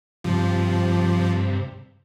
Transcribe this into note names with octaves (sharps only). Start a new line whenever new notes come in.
G2 C3 F3